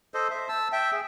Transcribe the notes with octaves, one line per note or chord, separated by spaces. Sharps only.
A4 C5 D#5
C5 E5
A5 E6
E5 G5
G#4